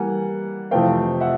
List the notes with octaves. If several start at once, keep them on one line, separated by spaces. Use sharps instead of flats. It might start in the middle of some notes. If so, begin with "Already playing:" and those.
Already playing: E3 G3 A#3 F#5 G#5
F2 C3 E3 A3 C4 F5 G5
E5 F#5